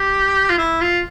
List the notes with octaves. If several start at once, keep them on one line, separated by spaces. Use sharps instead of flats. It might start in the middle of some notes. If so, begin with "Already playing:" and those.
Already playing: G4
F4
E4
F4